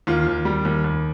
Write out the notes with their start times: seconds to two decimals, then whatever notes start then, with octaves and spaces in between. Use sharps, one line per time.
0.07 D#2 F4
0.27 D#2
0.45 G3
0.65 D#2
0.84 D#2